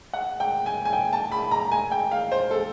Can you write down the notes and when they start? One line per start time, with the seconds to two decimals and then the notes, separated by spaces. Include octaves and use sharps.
0.13 F#5
0.40 G5
0.66 G#5
0.85 G#5
0.93 G5
1.13 A5
1.32 B5
1.51 A#5
1.72 G#5
1.92 G5
2.11 F5
2.32 C5
2.51 A4